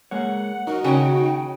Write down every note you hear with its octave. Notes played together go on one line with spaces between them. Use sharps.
G#3 A#3 C#5 F#5
B1 D#4 F#4 A#4
D#2 C#3 C#5 G5 G#5